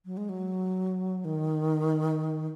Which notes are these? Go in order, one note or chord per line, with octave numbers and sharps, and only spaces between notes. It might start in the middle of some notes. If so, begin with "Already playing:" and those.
F#3
G#3
F#3
D#3